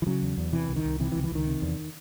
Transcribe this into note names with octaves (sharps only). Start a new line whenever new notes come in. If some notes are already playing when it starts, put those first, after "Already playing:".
E3
C#3 F#3
E2
E2
C3 E3
C2
D#3
C2
C3 E3
E3
C#2
E3
C#2 D#3
C3
E2